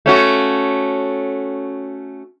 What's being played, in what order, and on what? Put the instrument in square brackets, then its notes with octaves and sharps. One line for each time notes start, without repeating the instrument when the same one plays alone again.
[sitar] A3 C#4 F#4